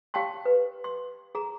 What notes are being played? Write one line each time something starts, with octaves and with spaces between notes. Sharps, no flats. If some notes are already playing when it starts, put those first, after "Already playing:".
G4 F5 G5 A5 C6
B4
C6
G#4 A#5